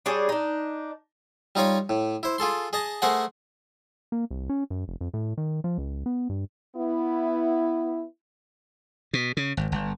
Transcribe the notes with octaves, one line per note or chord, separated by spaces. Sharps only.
G3 D4 G#4 C#5
D4 D#4
G3 D#4 F4 C#5 F5
A2
E4 C5
F4 G#4 A4 C6
G#4 D#5 A5
A3 G#4 A#4 C5 F#5 G#5
A#3
C2
C#4
F#2
F1
F2
A2
D#3
F3
C#2
B3
G2
B3 E4
B2
C#3
G#1
G1